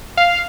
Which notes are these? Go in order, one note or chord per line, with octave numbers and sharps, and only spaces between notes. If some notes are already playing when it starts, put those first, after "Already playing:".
F5